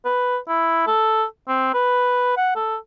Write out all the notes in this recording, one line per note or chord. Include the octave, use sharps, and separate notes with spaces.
B4
E4
A4
C4
B4
F#5
A4